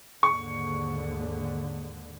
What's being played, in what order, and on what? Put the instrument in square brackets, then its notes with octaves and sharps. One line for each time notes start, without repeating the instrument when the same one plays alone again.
[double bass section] D#2 G#2 D3 [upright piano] C#6